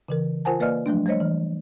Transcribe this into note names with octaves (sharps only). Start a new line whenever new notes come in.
C#3 E3 A#4
F4 A#4 C5 F#5 G#5 A5
A#3 B4 D5 D#5 F5 F6
F3 F#3 A3 D4
G3 A3 C5 C#5 D#5
E3